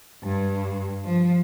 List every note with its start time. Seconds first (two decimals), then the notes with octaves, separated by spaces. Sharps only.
0.23 G2
1.05 F3